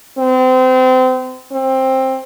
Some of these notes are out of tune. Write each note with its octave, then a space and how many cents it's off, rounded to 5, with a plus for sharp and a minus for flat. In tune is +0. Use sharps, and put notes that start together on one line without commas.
C4 -30
C4 +15